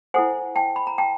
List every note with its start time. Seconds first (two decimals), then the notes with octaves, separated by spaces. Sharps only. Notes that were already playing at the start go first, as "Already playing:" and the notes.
0.14 E4 A4 C5 F#5 G#5
0.56 G5 A5
0.76 B5
0.87 A#5
0.98 G5 A5